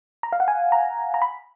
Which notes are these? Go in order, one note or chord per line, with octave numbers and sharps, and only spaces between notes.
A#5
F5
F#5
G#5
A#5
A#5
B5